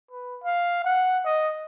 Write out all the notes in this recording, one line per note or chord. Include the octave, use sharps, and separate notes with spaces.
B4
F5
F#5
D#5